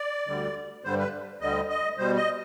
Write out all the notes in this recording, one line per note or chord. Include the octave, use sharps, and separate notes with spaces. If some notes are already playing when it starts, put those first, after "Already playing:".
Already playing: D5
D2 D3 G3
G2 D3 G3 C5
B4
D2 D3 G3 D#5
D#5
B2 G3 C5
D#5